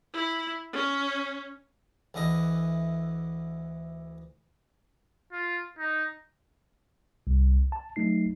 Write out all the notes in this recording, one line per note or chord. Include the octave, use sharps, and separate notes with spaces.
E4
C#4
D2 E3 D#5
F4
D#4
C2
A5
F#3 A3 D#4 C7